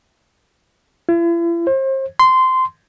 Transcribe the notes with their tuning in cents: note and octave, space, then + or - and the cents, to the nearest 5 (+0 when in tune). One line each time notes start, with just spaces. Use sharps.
E4 +45
C5 +35
C6 -15